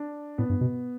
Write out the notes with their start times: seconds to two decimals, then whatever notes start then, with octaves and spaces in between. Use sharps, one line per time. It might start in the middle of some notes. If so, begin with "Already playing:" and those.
Already playing: D4
0.38 A2 B3
0.50 G2
0.61 B2